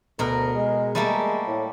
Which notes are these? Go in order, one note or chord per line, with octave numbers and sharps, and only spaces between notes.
D2 B2 A#4
G#3
G3 A3 A#3
A2